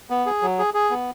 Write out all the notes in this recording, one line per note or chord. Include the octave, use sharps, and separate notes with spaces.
B3
G#4
F#3
G#4
G#4
B3